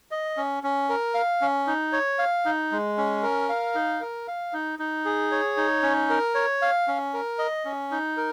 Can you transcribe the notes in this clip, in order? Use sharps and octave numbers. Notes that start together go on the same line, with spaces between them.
D#5
C#4
C#4
A#4
F5
C#4
D#4
C#5
F5
D#4
G#3
C#4
A#4
F5
D#4
A#4
F5
D#4
D#4
G#4
C#5
D#4
C#4
A#4
C#5
F5
C#4
A#4
D#5
C#4
D#4
A#4